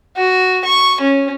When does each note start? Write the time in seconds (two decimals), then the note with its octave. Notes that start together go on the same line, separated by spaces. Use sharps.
0.17 F#4
0.65 C#6
1.01 C#4